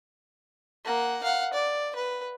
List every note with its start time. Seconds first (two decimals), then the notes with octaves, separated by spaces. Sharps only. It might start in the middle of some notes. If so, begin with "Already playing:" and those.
0.84 A#3 F#5
1.23 F5 F#5
1.53 D5
1.96 B4